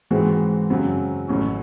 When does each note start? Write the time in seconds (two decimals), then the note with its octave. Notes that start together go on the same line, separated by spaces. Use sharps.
0.11 G#2 E3 G#3 C4 F#4
0.70 F#2 C#3 F#3 C4
1.28 A1 A2 F#3 C#4 F#4